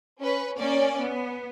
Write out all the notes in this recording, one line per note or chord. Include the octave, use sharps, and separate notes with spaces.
C#4 B4
A#3 C#4 D5
B3